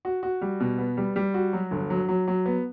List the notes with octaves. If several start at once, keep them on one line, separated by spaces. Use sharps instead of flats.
F#4
F#4
G3
B2
B3
G3
G3
F#4
F#3
G1
F#3
F#3
F#3
B3